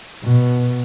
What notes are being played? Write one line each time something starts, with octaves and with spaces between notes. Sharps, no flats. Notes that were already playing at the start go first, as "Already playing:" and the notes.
B2